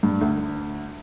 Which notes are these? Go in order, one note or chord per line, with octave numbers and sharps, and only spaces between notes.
G2
D2